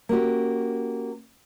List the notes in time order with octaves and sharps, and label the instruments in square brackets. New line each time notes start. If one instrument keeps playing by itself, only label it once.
[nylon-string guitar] A#3 C#4 F#4 G4